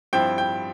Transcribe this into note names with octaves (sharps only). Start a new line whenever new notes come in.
G2 F3 C4 E4 G5
G5